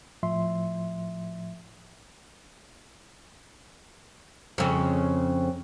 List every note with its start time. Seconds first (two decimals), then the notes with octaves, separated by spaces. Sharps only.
0.23 A2 F3 E5 C6
4.58 F2 C#3